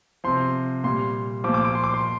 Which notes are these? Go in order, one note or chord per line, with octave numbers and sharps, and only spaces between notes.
C3 F3 C6
A#2 G3 C6
A#2 F3 D6
D6
D6
C6
D6
C6